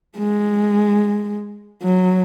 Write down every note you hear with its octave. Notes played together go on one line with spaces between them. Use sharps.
G#3
F#3